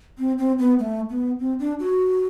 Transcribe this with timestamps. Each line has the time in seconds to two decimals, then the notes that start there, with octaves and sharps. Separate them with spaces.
0.18 C4
0.38 C4
0.59 B3
0.79 A3
1.10 B3
1.40 C4
1.59 D4
1.80 F#4